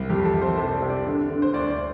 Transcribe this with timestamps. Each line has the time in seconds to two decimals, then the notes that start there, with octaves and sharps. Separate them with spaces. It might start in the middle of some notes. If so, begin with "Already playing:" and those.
Already playing: C2
0.09 F2 G4
0.25 A4
0.34 F2
0.42 C5
0.58 C3 A4
0.74 D5
0.82 C3
0.90 D5
1.06 D3
1.30 D3
1.42 C5
1.54 D2 D5
1.70 D5